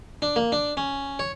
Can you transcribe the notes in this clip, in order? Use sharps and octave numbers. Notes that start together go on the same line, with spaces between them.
D4
A#3
D4
C#4
C#5